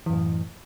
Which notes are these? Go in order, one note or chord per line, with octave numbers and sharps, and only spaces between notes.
F#2 A2 E3